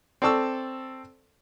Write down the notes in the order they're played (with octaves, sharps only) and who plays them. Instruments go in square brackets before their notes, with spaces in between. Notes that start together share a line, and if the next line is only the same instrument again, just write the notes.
[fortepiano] C4 A4 D5 A5 C#6 E6